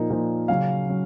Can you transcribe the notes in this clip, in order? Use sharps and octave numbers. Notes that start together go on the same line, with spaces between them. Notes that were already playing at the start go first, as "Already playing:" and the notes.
Already playing: A#2 F3 A#3 D#4
A#2 F3 A#3 D#4
C#3 F#3 C#4 F5
F#3 C#4